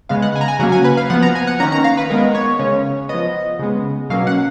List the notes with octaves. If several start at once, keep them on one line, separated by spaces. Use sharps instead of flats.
C#3 G#3 B3 F5
F#5
G#5
A#5
G#5
C#3 F#3 A#3 C#4 F#5
G#5
B4
F5
F3 B3 F#5
A#5
G#5
F#5
D#3 A#3 C#4 A#5
A#5
F5
B4
D#3 G#3 B3 A#4
C#5
C#3 G#3 C#4
F3 B3 D#5
C#3 G#3 B3
B2 F#3 A#3 C#4 F5
F#5